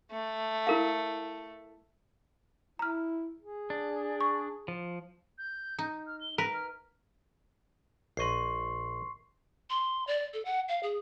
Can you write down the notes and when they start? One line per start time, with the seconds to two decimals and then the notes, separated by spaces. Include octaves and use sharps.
0.12 A3
0.67 E4 A#4 F5
2.79 E4 A#5 F6
3.39 G#4
3.70 D4
4.21 C#6
4.68 F3
5.38 G6
5.79 D#4
6.07 F6
6.21 G7
6.38 A#4 B4 A#6
6.54 F6
8.17 A#1 D#5 C6 C#6 C7
9.70 C6
10.07 D5
10.34 A4
10.45 F#5
10.68 F5
10.83 G#4